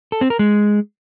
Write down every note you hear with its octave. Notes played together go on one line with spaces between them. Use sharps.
A4
C4
A#4
G#3